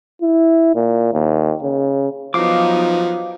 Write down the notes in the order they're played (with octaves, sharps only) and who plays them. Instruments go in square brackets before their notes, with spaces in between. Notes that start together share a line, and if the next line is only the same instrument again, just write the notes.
[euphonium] E4
A#2
D#2
C#3
[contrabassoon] F3 [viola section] F#3 B3 D#4 [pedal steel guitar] F5 D6